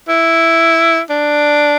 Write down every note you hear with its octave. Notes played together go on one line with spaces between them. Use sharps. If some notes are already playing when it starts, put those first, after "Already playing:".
E4
D4